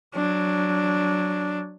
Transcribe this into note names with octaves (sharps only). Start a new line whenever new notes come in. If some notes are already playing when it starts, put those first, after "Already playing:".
F#3 D4